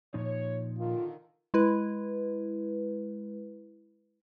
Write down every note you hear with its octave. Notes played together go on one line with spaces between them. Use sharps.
A#2 F3 D#4 C#5
D3 D#3 F4
G#3 E4 B4